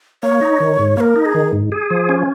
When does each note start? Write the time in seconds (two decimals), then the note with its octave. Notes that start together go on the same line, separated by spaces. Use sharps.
0.23 A#3 C#5
0.41 D#4
0.60 D#3
0.79 G#2
0.97 A#3 A#4 C#5
1.16 D#4
1.22 A#4
1.25 G#4
1.34 D#3
1.53 G#2
1.72 G#4
1.90 F3
2.09 C#4